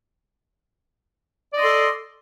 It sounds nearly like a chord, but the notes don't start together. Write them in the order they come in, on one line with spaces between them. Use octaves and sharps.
D5 D#5 C6 A4